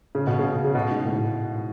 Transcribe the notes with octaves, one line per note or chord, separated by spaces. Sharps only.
C#3
B2
C#3
C#3
B2
G#2
A2